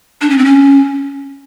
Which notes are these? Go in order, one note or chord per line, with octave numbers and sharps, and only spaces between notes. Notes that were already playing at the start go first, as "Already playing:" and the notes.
D4
C#4
C4
C#4